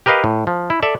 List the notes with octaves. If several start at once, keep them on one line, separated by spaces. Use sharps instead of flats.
G4 A#4 B4 D#5 F5
A2
F3
E4
A4 D5 E5